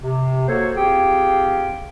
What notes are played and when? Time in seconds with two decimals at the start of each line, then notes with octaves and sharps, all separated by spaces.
0.04 C3
0.48 A#3 F#4 A4 C5 C#5
0.76 C4 F4 G4 G#4 G5